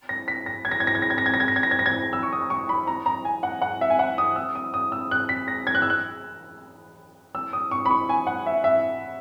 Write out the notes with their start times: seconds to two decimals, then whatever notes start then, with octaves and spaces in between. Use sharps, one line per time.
0.09 A#6
0.28 B6
0.46 A#6
0.65 G#6
0.71 A#6
0.80 G#6
0.87 A#6
0.95 G#6
1.02 A#6
1.10 G#6
1.18 A#6
1.26 G#6
1.34 A#6
1.40 G#6
1.48 A#6
1.56 G#6
1.63 A#6
1.71 G#6
1.79 A#6
1.86 G#6
2.13 E6
2.23 C#6
2.32 D#6
2.50 C#6
2.69 B5
2.87 A#5
3.06 A#5
3.25 G#5
3.43 F#5
3.62 F#5
3.81 E5
3.90 G#5
3.99 F#5
4.18 D#6
4.36 E6
4.55 D#6
4.74 D#6
4.92 E6
5.11 F#6
5.29 B6
5.48 A#6
5.67 G#6
5.75 F#6
5.82 E6
5.90 F#6
7.35 E6
7.53 D#6
7.71 C#6
7.86 B5
7.91 C#6
8.09 G#5
8.27 F#5
8.46 E5
8.64 E5